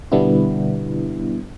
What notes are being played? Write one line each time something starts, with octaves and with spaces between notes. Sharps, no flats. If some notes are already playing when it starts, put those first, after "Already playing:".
B2 D3 G3 B3 D4 E4